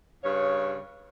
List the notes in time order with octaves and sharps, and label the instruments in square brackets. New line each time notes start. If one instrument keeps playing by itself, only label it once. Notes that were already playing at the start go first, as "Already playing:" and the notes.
[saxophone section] G2 C#3 C#5